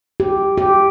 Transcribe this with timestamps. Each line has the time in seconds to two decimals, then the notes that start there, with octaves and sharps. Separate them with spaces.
0.20 G4
0.57 G4